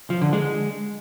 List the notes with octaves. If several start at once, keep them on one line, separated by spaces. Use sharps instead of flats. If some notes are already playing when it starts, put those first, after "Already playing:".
F3
D3
G#3